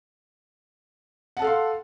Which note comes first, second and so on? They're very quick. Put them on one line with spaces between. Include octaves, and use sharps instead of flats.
F#5 A5 A4 F5 C6